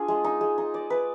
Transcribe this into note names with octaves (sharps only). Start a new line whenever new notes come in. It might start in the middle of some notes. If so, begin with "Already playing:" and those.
Already playing: D4 F4 G#4
G#3
D#4
G#3
D#4
D5
B4